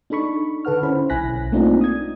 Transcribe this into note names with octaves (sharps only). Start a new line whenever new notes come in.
D4 D#4 A4 B5 C#6
D3 A4 B4 F#5 F6
C#4 E4 C5 B5
B1 E4 G#5 F#6 A#6 B6
A3 A#3 C4 D4 D#4 F4
D#6 G#6